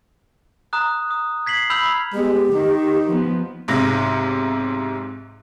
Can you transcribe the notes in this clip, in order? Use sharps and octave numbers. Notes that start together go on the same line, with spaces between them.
A#5 D#6 F#6
D#6
G#6 B6 C7 F#7
B5 E6 F6 G6 F7 F#7
G#3 B3 G4
D#3 D#4
F3 B3
B1 G#2 C3 A#6